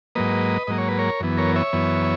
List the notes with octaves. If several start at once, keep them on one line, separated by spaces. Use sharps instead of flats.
G#2 F#3 A#3 B4 D#5
G#2 F#3 A#3 D#5
C#5
B4
A#4 C#5
F#2 E3 B3
A#4 C#5
C#5 E5
F#2 E3 B3